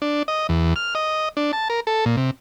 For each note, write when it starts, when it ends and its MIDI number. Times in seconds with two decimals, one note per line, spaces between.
0.02 0.23 62
0.28 0.47 75
0.49 0.74 40
0.76 0.94 89
0.95 1.29 75
1.37 1.52 62
1.53 1.68 81
1.70 1.80 70
1.87 2.05 69
2.06 2.16 46
2.17 2.31 48